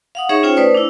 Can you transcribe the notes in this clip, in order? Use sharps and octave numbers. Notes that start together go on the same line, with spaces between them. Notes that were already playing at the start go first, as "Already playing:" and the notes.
F5 F#5 D#6
D#4 G#4 C#5 E5 C#6
C#4 F4 C5 C#5 G5
A3 B4 C5 D5 D#6
D4 E4